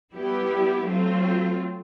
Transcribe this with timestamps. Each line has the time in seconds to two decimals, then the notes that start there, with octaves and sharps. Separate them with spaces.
0.14 G3 B3 E4 G4
0.86 F#3 A3 C4 F4